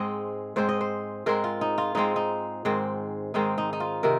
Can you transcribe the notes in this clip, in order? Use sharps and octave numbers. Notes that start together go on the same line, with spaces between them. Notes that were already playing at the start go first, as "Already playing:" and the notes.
Already playing: G#2 G#3 C4 D#5
G#2 G#3 C4 C5
D#5
C5
G#2 G#3 C4 A#4
F4
D#4
F4
G#2 G#3 C4 D#4
D#4
G#2 D#3 G#3 C4
G#2 D#3 G#3 C4 D#4
D#4
D#4
F4
C3 D#3 A#4